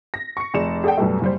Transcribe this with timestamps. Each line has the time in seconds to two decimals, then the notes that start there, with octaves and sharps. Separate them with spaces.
0.14 A#6
0.37 C#6 C#7
0.54 F1 G#4 D5 C#7 E7
0.84 G#4 A4 D5 F#5 G5
0.97 F#2 B2 G3 A3
1.22 F#1 G3 C5